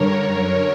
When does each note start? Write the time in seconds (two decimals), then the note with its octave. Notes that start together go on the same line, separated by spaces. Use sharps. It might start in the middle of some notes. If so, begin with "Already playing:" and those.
Already playing: G2 D3 A#4 C#5
0.23 F#2 D3 A#4 C#5